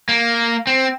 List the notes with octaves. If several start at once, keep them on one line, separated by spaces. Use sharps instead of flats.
A#3
C4